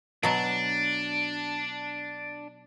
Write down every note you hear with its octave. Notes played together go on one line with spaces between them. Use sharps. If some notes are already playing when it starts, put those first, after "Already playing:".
B2 F#3 D4